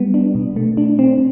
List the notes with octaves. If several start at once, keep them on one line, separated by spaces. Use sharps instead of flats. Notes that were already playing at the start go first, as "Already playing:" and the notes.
Already playing: G3 B3
D4
B2
A3
D4
C4